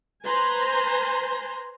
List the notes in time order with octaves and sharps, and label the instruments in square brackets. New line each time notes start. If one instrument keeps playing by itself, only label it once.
[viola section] B4 C5 G#5 A#5 C6